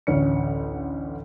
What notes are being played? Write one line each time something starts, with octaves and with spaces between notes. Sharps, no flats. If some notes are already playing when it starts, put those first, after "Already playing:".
A1 D2 C#4 C#7